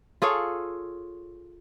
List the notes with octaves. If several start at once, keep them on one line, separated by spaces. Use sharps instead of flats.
F4 G#4 A4 C#5